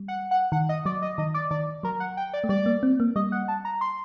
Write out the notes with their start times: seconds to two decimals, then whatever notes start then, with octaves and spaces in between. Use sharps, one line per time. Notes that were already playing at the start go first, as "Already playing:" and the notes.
Already playing: G3
0.08 F#5
0.31 F#5
0.52 D#3 F#5
0.69 D#5
0.86 F#3 D5
1.02 D#5
1.18 D#3 D#5
1.34 D5
1.51 D#3 D5
1.83 F#3 A#4
2.00 F#5
2.17 G5
2.33 D5
2.44 A3
2.49 G3 D5
2.66 A#3
2.83 C4
3.00 A#3
3.16 G3 D#5
3.32 F#5
3.48 A5
3.65 A#5
3.81 C6